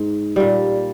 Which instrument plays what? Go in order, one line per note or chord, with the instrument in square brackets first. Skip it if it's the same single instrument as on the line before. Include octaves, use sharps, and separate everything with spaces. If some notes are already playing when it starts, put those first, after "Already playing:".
Already playing: [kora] G#2
A#2 G3